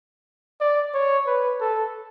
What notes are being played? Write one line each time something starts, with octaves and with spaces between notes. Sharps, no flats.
D5
C#5
B4
A4